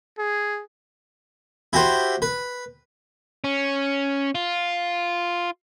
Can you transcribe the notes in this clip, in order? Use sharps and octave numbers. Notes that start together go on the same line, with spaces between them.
G#4
E4 F#4 G4 C5
B4
C#4
F4